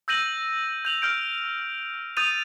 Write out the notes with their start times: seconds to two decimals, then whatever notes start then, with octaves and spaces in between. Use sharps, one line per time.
0.08 E6 G6 A#6 D#7 F#7
0.85 G6 F7 F#7
1.02 F6 G6 D7
2.17 D#6 G6 A6 D#7 F7